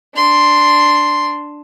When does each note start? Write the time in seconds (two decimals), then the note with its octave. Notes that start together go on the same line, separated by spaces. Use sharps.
0.16 D4 C6